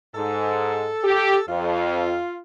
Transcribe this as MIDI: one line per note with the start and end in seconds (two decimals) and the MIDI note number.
0.15 0.89 44
0.15 1.42 69
1.04 1.36 67
1.49 2.15 41
1.49 2.40 65